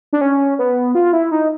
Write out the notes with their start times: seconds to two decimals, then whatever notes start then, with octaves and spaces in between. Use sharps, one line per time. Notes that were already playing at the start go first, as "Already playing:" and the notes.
0.13 D4
0.21 C#4
0.59 B3
0.95 F4
1.13 E4
1.31 D#4